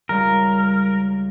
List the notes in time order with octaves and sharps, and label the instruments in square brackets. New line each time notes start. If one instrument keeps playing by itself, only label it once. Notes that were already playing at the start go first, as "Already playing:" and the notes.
[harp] C#2 G3 [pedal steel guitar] A#4